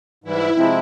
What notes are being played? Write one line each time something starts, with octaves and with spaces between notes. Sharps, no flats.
G#2 E3 G3 E4
C3 F3 G#3 C4 E4